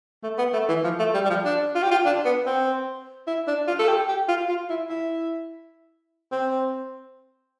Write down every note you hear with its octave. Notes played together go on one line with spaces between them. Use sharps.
A3
B3
A3
E3
F3
A3
G3
G3
F3
D4
F4
G4
F4
D4
B3
C4
E4
D4
F4
A4
G4
G4
F4
F4
E4
E4
C4